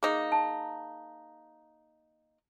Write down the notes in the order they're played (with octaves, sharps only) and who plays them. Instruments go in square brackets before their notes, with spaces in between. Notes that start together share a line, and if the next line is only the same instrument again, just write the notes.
[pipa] A#3 D#4 [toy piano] G#4
[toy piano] A5